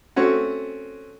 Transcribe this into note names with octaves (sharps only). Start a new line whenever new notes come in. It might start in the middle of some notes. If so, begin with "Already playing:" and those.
A3 C4 C#4 F#4